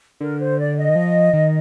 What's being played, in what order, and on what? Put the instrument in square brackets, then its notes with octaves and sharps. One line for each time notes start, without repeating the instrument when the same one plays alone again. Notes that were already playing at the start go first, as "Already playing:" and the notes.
[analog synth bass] D3 [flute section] A#4
[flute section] C5
D5
D#5
[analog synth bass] D#3
F3
D#3